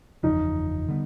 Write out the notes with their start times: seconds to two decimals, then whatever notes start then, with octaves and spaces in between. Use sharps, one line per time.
0.23 F#1 E2 C#3 F3 D#4
0.88 D3 G3 B3